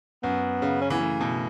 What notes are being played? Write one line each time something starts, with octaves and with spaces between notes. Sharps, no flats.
F#2 B3
C#3
C#4
E3 B3
C#3 A3
B2